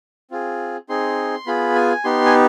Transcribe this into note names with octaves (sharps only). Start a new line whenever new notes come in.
C4 F4 G#4
C4 D#4 G#4 C6
B3 F4 G#4 B5
G#5
B3 D#4 G4 C6
G#5